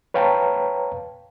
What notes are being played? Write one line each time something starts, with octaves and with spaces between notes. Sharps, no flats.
B4 C#5 F5 G5 A5 A#5